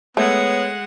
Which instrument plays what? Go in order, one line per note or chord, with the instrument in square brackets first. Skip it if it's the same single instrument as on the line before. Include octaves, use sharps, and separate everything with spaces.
[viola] G#3 F#5 [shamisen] A3 [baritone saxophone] B3 [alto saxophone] C#5